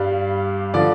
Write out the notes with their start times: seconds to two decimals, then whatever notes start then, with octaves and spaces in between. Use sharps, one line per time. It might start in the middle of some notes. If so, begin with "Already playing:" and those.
Already playing: G2 G3 F5
0.74 D3 F3 D5